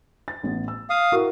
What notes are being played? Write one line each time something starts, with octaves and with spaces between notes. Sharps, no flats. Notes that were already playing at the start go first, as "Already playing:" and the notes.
A6
A1 B3
E6
F5 D#6
E4 F#4 A#4